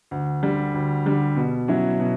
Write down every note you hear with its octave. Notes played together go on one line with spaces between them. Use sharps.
D2
D3 G3
D2
D3 G3
B2
F#3 C#4 E4
B2